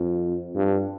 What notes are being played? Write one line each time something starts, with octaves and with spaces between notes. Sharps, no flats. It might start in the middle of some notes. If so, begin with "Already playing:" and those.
Already playing: F2
G2